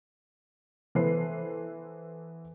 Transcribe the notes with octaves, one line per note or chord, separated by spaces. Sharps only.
E3 B3 A4 B4 C5 C7